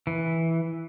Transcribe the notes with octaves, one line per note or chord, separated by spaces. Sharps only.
E3